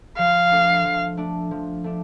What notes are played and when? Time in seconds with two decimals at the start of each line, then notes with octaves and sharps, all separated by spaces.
0.18 F3 F5
0.52 A3 D4
0.85 F3
1.17 A3 D4
1.51 F3
1.84 A3 D4